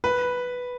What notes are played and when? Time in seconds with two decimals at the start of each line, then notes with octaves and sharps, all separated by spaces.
0.04 B4